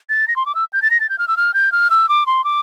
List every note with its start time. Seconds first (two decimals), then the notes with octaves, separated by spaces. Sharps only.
0.09 A6
0.28 A#6
0.36 C6
0.46 D6
0.55 E6
0.73 G6
0.82 A6
0.91 A#6
1.00 A6
1.09 G6
1.18 F6
1.28 E6
1.37 F6
1.54 G6
1.72 F6
1.90 E6
2.09 D6
2.26 C6
2.44 D6